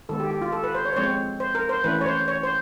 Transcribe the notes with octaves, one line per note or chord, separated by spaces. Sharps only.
D#3 G#3 B3 A4
G4
G4
F4
A4
B4
C5
C#5
C5
F3 G#3 C4 C#5
C5
A#4
C5
E3 A3 C#4 B4
C#5
C5
C#5
C5